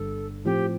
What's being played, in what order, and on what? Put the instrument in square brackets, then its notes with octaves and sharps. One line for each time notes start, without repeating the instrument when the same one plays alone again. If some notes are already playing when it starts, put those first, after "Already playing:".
Already playing: [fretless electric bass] G1 G2 D3 G3 [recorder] A4
[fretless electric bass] A2 F3 C4 [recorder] G4